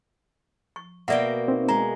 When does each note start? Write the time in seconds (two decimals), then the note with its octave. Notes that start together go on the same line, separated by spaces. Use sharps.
0.76 C#6
1.08 B2 A#3 D5 E5 F#5 G5
1.48 C4 D#4
1.68 G#3 A#5